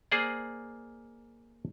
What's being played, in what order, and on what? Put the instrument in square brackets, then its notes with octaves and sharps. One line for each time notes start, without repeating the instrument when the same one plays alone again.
[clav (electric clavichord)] A#3 G#4 C5 D5